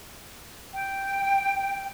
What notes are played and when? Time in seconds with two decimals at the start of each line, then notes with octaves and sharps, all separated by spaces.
0.73 G5